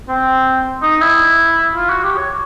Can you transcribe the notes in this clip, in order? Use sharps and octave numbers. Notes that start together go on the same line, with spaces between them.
C4
D#4
E4
F4
F#4
G4
C#5